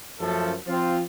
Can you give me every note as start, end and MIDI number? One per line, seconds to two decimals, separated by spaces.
0.20 0.54 42
0.20 0.54 53
0.20 0.54 57
0.20 0.54 69
0.67 1.00 53
0.67 1.00 60
0.67 1.00 65